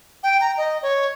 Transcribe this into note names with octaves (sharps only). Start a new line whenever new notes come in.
G5
A#5
D#5
C#5